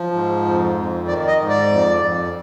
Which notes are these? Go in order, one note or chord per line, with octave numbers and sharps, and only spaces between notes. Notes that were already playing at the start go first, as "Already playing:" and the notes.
Already playing: F3
G#2
F2
F2
D#3 D5
D#5
G#2
D5
F2
F2